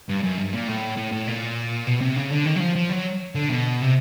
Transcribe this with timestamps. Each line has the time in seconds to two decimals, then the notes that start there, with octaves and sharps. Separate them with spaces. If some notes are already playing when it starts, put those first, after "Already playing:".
0.09 G2
0.23 F#2
0.38 G2
0.53 A#2
0.67 A2
0.97 A2
1.12 A2
1.27 A#2
1.87 B2
2.01 C3
2.16 C#3
2.30 D3
2.46 D#3
2.56 F#3
2.61 F3
2.76 F3
2.90 F#3
3.35 D3
3.49 B2
3.82 C3